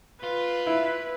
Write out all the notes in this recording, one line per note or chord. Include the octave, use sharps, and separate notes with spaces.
F4 B4
E4